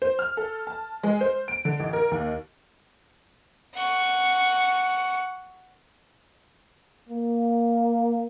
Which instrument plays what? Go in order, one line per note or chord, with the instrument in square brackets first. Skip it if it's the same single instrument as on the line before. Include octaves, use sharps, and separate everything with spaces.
[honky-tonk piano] C5
F6
A4
A5
G#3
C5
D7
D3
A1
A#4
D#2
[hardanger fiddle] F#5 C#6
[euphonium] A#3